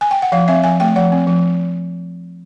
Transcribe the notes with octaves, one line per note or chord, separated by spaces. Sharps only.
G#5
G5
F#5
F3 F5
C4 E5
F3 G#5
A3 G5
F3 F#5
C4
F3